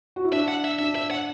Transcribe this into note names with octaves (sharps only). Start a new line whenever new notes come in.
F#4
E4
D4 E5
F#5
E5
D4 E5
E5
F#5